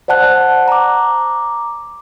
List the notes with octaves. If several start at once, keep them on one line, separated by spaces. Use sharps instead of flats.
C5 D5 F#5 A5 F#6
A#5 D6